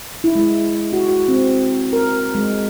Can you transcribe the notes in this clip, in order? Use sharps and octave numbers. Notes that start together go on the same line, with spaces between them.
E4
G#3
F#4
F#4
C4
A#4
G#3